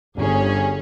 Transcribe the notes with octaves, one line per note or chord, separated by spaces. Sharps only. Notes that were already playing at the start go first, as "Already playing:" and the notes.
G1 C#4 G#4